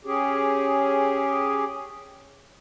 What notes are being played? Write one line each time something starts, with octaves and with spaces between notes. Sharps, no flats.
C#4 G4 G#4